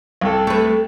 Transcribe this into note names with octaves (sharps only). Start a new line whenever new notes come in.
C2 A4
A3 B4